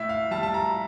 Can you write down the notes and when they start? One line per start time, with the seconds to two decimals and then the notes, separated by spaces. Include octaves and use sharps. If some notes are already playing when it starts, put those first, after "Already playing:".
Already playing: A2 E5
0.09 F5
0.31 G3 A5
0.43 A5
0.54 A#5